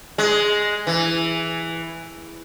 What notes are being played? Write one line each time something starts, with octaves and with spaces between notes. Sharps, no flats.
G#3
E3